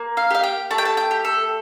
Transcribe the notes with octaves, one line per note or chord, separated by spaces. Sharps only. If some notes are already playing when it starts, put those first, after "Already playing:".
Already playing: A#3
F5
G4 F5
G5
A3 A5
G5
A5
G5
G4
A4